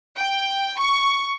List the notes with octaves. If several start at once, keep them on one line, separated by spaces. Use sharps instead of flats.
G5
C#6